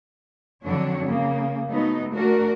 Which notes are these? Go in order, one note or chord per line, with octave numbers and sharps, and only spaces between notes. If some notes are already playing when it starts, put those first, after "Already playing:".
F2 D3 F#3 D4 C#5
C#3 A#3
F#3 A3 B3 D#4
A3 D4 F#4 A#4